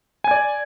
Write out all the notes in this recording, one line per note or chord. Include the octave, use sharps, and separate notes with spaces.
D5 G#5 G#6